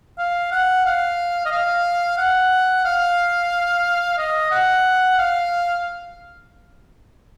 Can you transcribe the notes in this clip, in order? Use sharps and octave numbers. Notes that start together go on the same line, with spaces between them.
F5
F#5
F5
D#5
F5
F#5
F5
D#5
F#5
F5